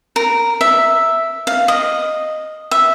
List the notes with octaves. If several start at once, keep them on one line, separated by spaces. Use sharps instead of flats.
A#4
E5
F5
D#5
E5